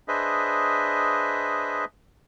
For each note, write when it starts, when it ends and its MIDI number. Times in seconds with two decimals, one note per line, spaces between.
0.08 1.85 62
0.08 1.85 68
0.08 1.85 71
0.08 1.85 72
0.08 1.85 75
0.08 1.85 76